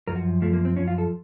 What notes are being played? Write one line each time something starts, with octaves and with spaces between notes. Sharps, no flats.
F#2 F3 A#4
F#4
F#2 F3 A3
A#3
C4
F#2 F3 C#4
F4
A4